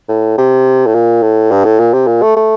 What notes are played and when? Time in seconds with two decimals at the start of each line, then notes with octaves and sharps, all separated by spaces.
0.09 A2
0.38 C3
0.87 A2
0.94 A#2
1.22 A2
1.51 G2
1.65 A2
1.79 A#2
1.94 C3
2.07 A#2
2.22 A3
2.37 A3